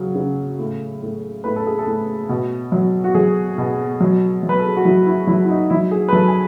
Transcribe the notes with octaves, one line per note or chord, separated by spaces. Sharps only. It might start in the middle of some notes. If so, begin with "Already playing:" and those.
Already playing: C#3 F#3
C#3
A2
A2
A2 B4
A4
G#4
A4
A2
B2
F#3
F#4
F#3 G#4
B2
F#3
F#3
B4
A4
G#4
F#4
F#3 E4
E4
F#3 E4
E4
D#4
F#3 E4
G#4
B4
F#3 A4
G#5